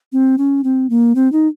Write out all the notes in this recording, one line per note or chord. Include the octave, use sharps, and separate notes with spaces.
C4
C#4
C4
A#3
C4
D#4